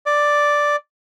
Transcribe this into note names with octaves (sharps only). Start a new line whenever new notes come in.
D5